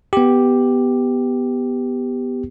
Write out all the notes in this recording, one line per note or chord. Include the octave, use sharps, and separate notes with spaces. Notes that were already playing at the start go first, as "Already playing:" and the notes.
B3 G4